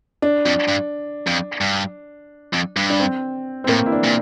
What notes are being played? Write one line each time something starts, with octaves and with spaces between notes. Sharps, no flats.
D4
F2
G2
F2
G2
F2
G2
D4
C4
C4
A2 A#3
E4
D4
A#2